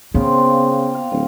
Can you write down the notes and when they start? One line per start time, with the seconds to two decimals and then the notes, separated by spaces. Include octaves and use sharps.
0.15 C#3 B3 C4 A#4 C5
0.33 A#2 D5
0.94 F5
1.12 D1